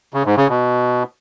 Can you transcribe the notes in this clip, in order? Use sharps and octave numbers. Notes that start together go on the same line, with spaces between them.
C#3
G#2
C#3
B2